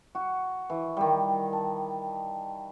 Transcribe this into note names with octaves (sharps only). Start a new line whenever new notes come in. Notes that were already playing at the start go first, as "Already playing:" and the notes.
F#4
E3
D#3 G3
A5